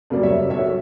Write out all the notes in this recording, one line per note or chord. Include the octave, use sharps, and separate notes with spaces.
F#2 C#3 G3 A#3 D5
C#5 E5
B1 C#5 E5